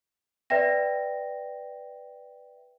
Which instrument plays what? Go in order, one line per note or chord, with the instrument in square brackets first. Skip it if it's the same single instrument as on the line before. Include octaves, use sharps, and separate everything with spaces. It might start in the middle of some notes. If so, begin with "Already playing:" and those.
[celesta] B4 D5 E5 G5 A#6